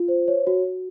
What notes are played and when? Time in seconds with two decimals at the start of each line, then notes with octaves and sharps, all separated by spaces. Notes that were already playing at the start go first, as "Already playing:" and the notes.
Already playing: F4
0.08 C5
0.28 C#5
0.47 F#4
0.65 F#4